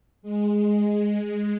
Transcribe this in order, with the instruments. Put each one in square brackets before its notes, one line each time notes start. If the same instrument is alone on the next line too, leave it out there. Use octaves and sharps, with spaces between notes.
[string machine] G#3